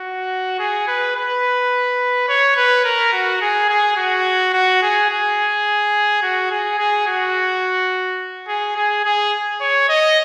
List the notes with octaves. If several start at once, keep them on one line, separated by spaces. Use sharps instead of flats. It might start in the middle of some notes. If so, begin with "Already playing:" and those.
Already playing: F#4
G#4
B4
B4
C#5
B4
A#4
F#4
G#4
G#4
F#4
F#4
G#4
G#4
F#4
G#4
G#4
F#4
G#4
G#4
G#4
C#5
D#5